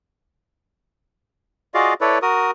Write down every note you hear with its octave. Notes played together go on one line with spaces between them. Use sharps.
F4 F#4 G#4 D5 D#5 F5
E4 A4 B4 C#5 D5
F#4 A#4 D#6